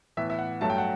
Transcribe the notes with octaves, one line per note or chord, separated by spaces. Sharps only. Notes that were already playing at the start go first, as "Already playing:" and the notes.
A2 E3 B3 E5
E5
F#5
G2 F#3 A3 A5
G5
F#5